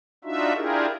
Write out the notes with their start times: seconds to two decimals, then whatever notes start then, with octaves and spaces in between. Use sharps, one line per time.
0.24 D4 D#4 F4 F#4 E5
0.55 D4 E4 F4 G4 G#4 A#4